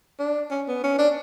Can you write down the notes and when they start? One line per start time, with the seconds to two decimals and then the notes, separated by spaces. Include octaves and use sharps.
0.20 D4
0.51 C#4
0.68 B3
0.84 C#4
0.99 D4